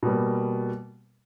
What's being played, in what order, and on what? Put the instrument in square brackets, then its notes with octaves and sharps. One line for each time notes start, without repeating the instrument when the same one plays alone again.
[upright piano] B2 G3 A#3